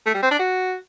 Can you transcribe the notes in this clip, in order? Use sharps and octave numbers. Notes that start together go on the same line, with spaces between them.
A3
G3
C4
D4
F#4